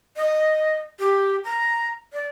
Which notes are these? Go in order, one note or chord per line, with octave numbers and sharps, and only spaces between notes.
D#5
G4
A#5
D5